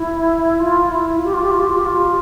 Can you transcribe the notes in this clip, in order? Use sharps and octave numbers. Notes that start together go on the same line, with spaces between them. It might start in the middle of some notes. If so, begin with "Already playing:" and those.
Already playing: E4
F4
E4
F4
G4
F4
G4
F4
G4
F4
G4
F4